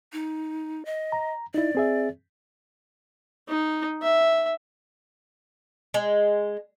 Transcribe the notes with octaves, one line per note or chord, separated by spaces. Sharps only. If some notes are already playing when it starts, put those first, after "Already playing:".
D#4
D#5
A#5
D#4 E4 D5
C4 G#4 E5
D#4
E5
G#3